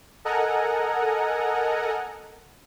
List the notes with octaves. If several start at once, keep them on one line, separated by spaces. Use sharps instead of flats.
A4 A#4 D#5 F#5 G#5 A#5